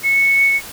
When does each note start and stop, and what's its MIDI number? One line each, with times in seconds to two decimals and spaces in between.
0.04 0.56 97